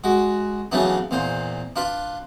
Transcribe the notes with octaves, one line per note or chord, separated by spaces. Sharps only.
G#3 F#4
C#3 E3 F#3 A3 B3 D4
E2 A#2 C5
D4 F4 B4